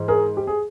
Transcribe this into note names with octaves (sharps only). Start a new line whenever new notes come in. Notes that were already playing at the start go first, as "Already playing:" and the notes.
Already playing: G#2 E3
G#4 A#4
G4
G#4